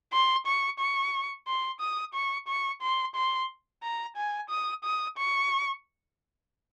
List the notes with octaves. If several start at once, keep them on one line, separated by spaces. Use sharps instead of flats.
C6
C#6
C#6
C6
D#6
C#6
C#6
C6
C6
A#5
G#5
D#6
D#6
C#6